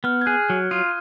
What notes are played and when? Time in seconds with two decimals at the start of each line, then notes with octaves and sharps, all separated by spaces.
0.04 B3 F6
0.21 G#6
0.26 G#4 F#6
0.50 F#3
0.71 F4 D#6 D#7